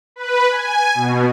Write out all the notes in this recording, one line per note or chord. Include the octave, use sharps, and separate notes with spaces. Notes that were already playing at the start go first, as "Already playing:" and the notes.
B4
G#5
B2